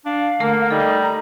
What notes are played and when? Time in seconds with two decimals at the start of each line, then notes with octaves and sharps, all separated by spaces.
0.06 D4 F5
0.40 D3 A3 A#3 A#4
0.71 G3 D#4 A4 D#5
1.02 A#5